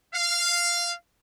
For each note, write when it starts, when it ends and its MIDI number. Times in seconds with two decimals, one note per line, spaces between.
0.13 0.93 77